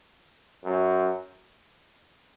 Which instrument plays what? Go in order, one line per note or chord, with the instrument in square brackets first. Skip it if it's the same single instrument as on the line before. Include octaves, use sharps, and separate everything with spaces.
[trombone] F#2